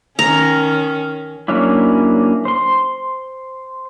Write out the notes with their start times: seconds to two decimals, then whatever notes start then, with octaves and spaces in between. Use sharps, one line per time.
0.19 D#3 C#4 A#5
1.48 F#3 A#3 C#4 D4 E4
2.45 C5 C6